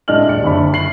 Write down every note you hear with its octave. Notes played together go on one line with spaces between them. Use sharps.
A2 G#3 D4 D#5 F6 F#7
D#1 D5 C#7
F#1 D3 B5
C7 F#7